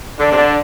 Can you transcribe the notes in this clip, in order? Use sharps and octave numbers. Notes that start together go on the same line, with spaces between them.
D3 D4
C3
D3